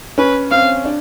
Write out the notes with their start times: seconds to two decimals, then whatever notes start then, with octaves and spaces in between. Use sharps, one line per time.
0.18 C#4 B4
0.51 C4 F5
0.85 D4